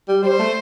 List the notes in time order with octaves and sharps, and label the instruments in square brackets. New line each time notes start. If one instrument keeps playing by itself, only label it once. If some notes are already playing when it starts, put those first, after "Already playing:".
[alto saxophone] G3
[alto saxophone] G3 [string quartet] C5
[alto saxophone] A3